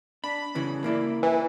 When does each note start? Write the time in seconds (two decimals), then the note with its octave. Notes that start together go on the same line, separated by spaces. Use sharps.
0.24 D4 B5
0.55 C#3 E3 C#4
0.84 A#3 E4 D5
1.23 E3